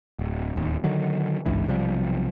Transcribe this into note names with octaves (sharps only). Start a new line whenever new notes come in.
D1
D1 D#2
D3 D#3 F#3
G#1 C#2 G2 E3
B1 C3 F3 G3